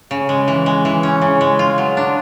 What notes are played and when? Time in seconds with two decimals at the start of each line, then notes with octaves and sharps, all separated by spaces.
0.11 C#3
0.29 G#3
0.48 E3
0.66 G#3
0.85 E3
1.03 C#4
1.22 C#3
1.41 G#3
1.59 F4
1.78 F#3
1.97 D4